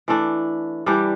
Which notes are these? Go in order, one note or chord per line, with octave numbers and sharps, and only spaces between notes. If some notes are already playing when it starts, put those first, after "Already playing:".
E3 A3 D4
E3 G3 D4 G4